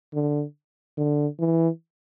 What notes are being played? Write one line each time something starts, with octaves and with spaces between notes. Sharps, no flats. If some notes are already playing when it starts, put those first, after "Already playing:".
D3
D3
E3